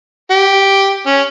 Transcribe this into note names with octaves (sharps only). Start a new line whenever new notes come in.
G4
C#4